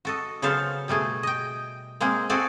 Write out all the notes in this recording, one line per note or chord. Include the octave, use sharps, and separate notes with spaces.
F#4 A4 D#5
C#3 F#3 B3 A4 C5 F5
B2 G3 A3 G#4
D#5 G5
G#3 A#3 C4 G#4
C4 F#4 G#4 A4 D5